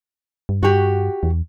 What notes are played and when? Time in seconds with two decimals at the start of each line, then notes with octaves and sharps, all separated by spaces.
0.49 G2
0.63 G2 F#4 G4
1.23 E2